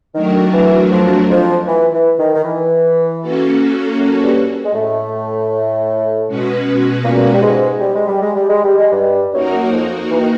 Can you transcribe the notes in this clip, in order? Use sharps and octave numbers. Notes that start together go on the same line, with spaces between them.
D#3 F#3 A3 D4 F#4 A#4
E3
F2 F3
F2 F3
E3
E3
D#3
D#3
E3
A#3 C#4 F#4 A4
F#2 F#3
G2 G3
G#3
A2 A3
B2 G#3 C#4 F#4 B4
A#2 A#3
G3
G#2 G#3
G3
G#3
G3
G#3
G3
G#3
G3
G#3
G2 G3
F#2 F#3 A#3 D#4 F#4 A#4
F#3
F2 F3
E3
D#3